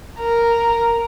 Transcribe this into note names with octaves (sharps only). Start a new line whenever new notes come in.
A#4